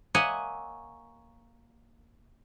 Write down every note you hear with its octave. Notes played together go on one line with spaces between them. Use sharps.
A#3 C#5 D#5 E5 F#5 G#5